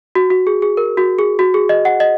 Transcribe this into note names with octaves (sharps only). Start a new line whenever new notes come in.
F#4
F#4
G#4
G#4
A#4
F#4
G#4
F#4
G#4
D#5
F#5
D#5